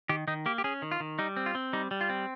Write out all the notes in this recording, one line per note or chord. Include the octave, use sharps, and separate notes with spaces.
D#3 G4
D#3 D#4
A#3 G4
G4
C#4 G#4
D#3
F4
D#3
G3 D#4
C4
F4
C4
G3 D#4
G3
F4
C4